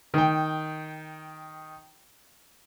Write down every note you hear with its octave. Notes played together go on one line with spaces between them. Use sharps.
D#3 G5